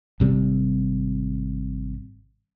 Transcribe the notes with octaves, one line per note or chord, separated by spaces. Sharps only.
G#1 C3 G3